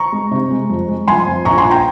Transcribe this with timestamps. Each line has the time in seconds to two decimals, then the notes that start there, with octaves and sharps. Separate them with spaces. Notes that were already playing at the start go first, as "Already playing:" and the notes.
Already playing: A#5 C#6
0.12 G#3
0.31 C3
0.51 G#3
0.69 F2
0.88 G#3
1.07 F3 G#5 C6
1.27 F2
1.45 A#1 A#5 C#6
1.58 G#5 C6
1.65 A#1
1.71 G5 A#5